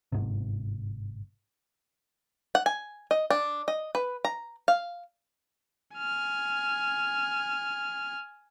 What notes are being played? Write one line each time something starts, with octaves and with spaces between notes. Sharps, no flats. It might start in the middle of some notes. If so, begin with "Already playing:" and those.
G1 G#2 C3
F#5
G#5
D#5
D4
D#5
B4
A#5
F5
G#5 F6